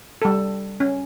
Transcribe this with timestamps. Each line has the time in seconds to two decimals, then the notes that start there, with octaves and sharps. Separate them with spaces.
0.22 G3 A4
0.80 C#4